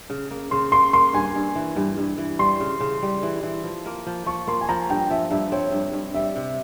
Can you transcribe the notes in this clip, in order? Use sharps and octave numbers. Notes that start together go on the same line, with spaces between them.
C#3
A#3
C#3 C6
A#3 C6
A#3 C6
G2 G#5
G2
E3
G2
G2
E3
G3 C6
C#3
C#3
G3
E3
E3
F3
A#3
F3
F3 C#6
A#3 C6
G#5
F3 A#5
G2 G5
F3 E5
G2 E5
C4 C#5
G2
G2
G3 E5
C3